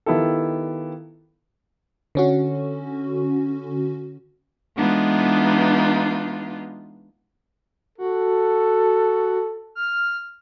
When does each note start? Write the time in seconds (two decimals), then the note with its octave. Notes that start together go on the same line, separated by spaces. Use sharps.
0.06 D#3 B3 E4 F4 G4 A4
2.15 D3 C#4 F#4
4.76 E3 G#3 B3 D4 D#4 F4
7.98 F#4 A4
9.75 F6